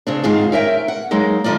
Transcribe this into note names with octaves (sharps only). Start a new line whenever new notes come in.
C#3 C4 D4
F2 G#2 D#3 C4 F4 G#4
C#4 A#4 E5 G5
F#5
F#3 G#3 A#3 D#4
D3 D#3 A#3 F4 D5